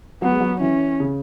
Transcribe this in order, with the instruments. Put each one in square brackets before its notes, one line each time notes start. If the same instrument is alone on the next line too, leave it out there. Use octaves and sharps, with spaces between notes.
[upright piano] F#3 [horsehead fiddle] B3
[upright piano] G#3
F#3
[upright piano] E3 [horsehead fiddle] C#4
[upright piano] C#3